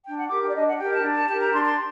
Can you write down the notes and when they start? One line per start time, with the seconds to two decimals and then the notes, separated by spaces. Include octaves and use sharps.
0.05 D4 G5
0.18 F#5
0.30 G4 A#4 D6
0.42 G5
0.49 D5
0.55 D4 D#5
0.66 F#5
0.79 G4 A#4 G5
0.92 A5
1.04 D4
1.16 A5
1.28 G4 A#4 A5
1.40 A#5
1.52 D4 C6
1.65 C6